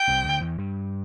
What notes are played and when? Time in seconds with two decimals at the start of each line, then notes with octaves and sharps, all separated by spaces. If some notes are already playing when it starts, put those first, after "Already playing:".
Already playing: G5
0.08 C2 C3
0.25 D2 D3
0.41 E2 E3
0.58 G2 G3